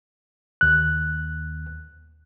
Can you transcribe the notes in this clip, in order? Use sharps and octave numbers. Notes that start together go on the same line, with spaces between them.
D#2 F#6